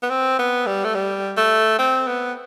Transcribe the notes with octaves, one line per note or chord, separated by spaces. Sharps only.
B3
C4
B3
G3
A3
G3
A3
C4
B3